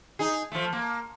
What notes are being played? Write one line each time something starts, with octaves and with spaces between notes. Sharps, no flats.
D#4 G#4
F3 A3
A#3